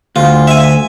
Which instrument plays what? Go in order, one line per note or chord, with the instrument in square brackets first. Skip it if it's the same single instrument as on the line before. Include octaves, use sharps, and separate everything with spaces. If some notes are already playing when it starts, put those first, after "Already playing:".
[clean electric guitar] D2 [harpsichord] F4
[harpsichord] E5 G#5